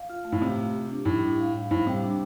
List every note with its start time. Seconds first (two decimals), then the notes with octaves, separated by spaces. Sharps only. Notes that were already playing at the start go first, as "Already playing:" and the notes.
Already playing: F5
0.10 F4
0.25 A3
0.32 A2
0.42 C3 A3
0.58 F4
0.74 G4
0.89 D4
1.05 A2 G3
1.23 D4
1.38 F5
1.55 G3
1.70 A2 C5
1.87 C3 G3
2.03 D4